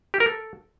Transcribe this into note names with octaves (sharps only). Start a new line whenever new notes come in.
G4
A#4
A4